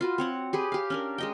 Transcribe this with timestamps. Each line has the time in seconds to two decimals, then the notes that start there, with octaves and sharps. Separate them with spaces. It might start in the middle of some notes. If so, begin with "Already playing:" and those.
0.01 F4 F#4 B4
0.18 C4 C#5 F#5
0.53 G4 G#4 B4
0.72 G4 F5
0.90 C#4 D4 A#4
1.18 G#3 D#5 G5